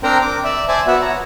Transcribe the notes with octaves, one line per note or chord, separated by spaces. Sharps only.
C4 D4 A#4 C5 G5 A#5
D6
D5 E5
C5 D5 E5 G#5 A5
B3 F#4 E5
C#5 A#5